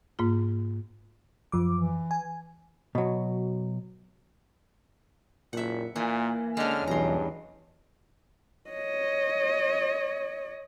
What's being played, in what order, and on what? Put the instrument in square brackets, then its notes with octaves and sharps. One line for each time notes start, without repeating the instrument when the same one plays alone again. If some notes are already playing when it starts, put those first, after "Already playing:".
[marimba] G#2 A#3 F4
[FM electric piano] F#2 F3 D6
[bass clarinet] E3
[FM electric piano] G#5
[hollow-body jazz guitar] B2 F#3
[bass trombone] F#1 [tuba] A#2 [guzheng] E5 F#5
[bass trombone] A#2 [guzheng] E3 [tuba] A#3
[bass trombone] D3 [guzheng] G#3 C#4 [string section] F6
[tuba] B1 [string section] E2 [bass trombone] G2 [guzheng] A#5 C6
[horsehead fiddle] C#5 D#5